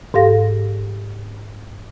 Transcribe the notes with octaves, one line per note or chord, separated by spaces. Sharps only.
G#2 G4 A4 F5 A#6